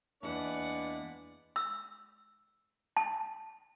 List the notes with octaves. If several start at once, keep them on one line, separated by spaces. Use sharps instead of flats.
E2 G#3 A#3 D4 E4 B4 D5 F#5
E6
A5